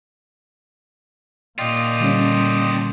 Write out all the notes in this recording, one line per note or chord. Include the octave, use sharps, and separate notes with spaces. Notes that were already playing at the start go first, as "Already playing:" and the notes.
D#2 A#2 F4 D5 D#5 G5
D3 G3 C#4